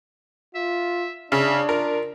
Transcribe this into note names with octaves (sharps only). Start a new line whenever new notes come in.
F4 E5
C#3 D4 E5
F4 A#4